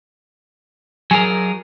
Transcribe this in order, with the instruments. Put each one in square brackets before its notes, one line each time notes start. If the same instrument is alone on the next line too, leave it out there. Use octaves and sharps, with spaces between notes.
[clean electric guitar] F#3 G#4 A#4 [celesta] G#5